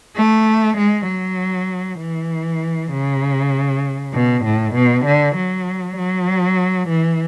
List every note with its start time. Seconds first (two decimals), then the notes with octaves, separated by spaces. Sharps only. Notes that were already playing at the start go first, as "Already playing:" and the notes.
0.16 A3
0.77 G#3
1.08 F#3
2.00 E3
2.92 C#3
4.14 B2
4.45 A2
4.75 B2
5.05 D3
5.36 F#3
5.97 F#3
6.89 E3